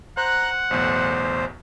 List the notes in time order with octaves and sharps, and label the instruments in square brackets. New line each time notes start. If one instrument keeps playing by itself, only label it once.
[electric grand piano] C5 [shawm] F#5 [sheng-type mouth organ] A#5 F#6
[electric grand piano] B1 E2 A2 [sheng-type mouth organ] C5